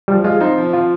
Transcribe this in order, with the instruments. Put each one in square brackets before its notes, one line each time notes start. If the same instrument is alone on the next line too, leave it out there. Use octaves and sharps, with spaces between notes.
[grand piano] F3 [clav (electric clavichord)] G3
[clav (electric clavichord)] G#3 [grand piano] F4
[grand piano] C4 [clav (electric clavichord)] D#4
[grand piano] F3
[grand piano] F3 [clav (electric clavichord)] F4